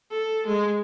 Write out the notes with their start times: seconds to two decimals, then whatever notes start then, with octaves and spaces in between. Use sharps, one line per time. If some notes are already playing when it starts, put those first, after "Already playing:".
0.11 A4
0.47 G#3